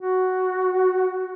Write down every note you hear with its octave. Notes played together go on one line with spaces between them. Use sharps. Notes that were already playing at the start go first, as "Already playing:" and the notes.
F#4